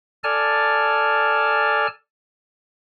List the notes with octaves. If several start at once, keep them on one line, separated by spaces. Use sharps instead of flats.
A4 D5 G#5 A5 F6